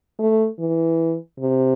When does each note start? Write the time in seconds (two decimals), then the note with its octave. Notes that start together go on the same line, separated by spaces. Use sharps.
0.19 A3
0.59 E3
1.40 C3